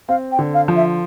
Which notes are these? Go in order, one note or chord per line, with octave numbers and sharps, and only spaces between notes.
C4 F5
G5
D3
F5
F3
E5